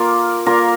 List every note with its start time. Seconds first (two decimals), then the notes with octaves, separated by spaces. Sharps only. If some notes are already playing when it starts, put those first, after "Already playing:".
Already playing: A#3 F4 A#4
0.46 A#3 F4 A#4